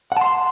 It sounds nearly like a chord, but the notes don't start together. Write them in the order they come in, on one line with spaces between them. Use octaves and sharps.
F#5 A5 C6